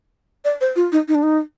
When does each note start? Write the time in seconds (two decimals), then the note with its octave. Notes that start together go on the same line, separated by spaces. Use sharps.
0.45 D5
0.61 C5
0.76 F4
0.92 D#4
1.08 D#4
1.15 D4
1.23 D#4